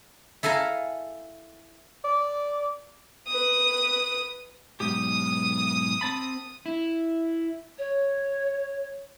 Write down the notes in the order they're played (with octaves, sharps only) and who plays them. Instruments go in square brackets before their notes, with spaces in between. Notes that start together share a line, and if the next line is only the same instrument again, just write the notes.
[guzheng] E4 A4 F5 G#5 A#5
[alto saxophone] D5
[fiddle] B4 D#6
[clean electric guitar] B1 G#2 G4 [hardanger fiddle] D#6
[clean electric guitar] C4 A5 B5
[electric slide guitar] E4
[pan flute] C#5